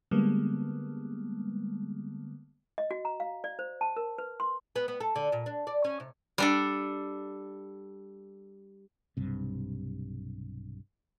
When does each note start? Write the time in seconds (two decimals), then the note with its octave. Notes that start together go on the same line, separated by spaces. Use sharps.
0.11 D3 G3 G#3 A#3 B3
2.78 D#5
2.91 F#4
3.05 A#5
3.20 F5
3.44 D5
3.59 C5
3.81 A5
3.97 A#4
4.18 B4
4.40 C6
4.76 B3
4.88 B3
5.00 A4
5.16 D3
5.32 A#2
5.46 D4
5.67 D5
5.84 C#4
6.00 C3
6.38 G3 D4 A4
9.17 B1 G2 C3